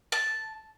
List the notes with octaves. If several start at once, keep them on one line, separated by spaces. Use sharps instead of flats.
A5